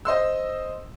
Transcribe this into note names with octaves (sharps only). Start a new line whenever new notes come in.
C5 D#5 C6 E6